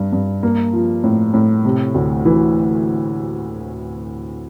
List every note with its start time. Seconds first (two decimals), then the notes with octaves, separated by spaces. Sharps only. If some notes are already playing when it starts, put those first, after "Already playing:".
Already playing: G2
0.13 G2
0.43 A#3
0.73 F3
1.04 A2
1.34 A2
1.65 C3
1.94 D2
2.25 E3